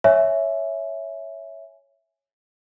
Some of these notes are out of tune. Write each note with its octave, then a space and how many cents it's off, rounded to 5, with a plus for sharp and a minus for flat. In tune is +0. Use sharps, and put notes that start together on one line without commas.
C#5 +0 E5 +0 G#5 +0